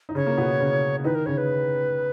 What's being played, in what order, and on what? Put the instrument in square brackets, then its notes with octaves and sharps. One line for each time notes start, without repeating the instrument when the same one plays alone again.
[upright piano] D#4
[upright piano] C#3 C#4 [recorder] C#5
[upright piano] A#3
B2 B3
C#3 C#4
[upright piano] D#3 D#4 [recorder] B4
[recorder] A#4
[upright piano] C#3 C#4 [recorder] C#5
[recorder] B4